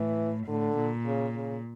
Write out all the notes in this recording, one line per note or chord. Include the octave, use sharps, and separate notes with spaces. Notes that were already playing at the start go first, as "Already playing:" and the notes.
Already playing: A2 E3
A2 D3
A#2
C#3
C#3